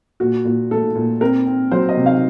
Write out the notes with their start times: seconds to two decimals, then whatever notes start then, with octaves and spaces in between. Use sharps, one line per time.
0.20 A#2 F#4
0.45 A#2
0.71 A3 A4
0.95 A#2
1.21 C4 A#4
1.46 C4
1.72 F#3 C5
1.89 D#5
1.97 C3
2.06 F5